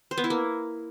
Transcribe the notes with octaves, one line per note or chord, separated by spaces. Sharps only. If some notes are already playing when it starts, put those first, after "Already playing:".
C5
B3
E4
A#3